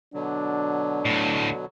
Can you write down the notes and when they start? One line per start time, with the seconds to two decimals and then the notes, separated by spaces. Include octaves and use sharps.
0.14 B2 D3 F#3 D4
1.05 D2 A2